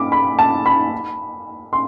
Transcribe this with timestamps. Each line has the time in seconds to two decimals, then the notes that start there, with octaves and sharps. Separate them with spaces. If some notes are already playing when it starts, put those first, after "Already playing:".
Already playing: B5 D6
0.12 B5
0.39 A5
0.66 B5
1.73 C6